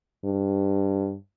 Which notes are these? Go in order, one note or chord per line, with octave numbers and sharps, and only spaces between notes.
G2